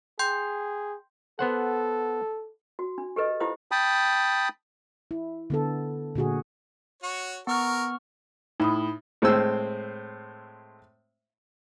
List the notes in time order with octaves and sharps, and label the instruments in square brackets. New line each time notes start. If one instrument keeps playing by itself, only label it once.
[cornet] G#4 [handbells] G5 C6 G6
[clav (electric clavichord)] B3 C5 F#5 [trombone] A4
[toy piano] F#4
D4
G4 A4 B4 D#5
E4 F4 G4 C5 F5 D#6
[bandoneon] G5 A5 B5 D#6
[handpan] E4
D3 B3 A4
A#2 D3 F#4 G#4
[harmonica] F#4 C#5
[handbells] B3 C#6 F6 [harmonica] A#4
[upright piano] A2 [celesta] D#4 B5 D#6
[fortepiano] A2 G#3 C4 C5 E6